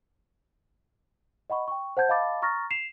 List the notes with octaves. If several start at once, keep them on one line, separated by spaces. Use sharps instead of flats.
D#5 F#5 B5 C#6
G5 C#6
C5 F#5 A5 G6 G#6
D#5 F5 A5 B5 D6 A6
A#5 C#6 D#6 F6 A6 A#6
C7 E7 F7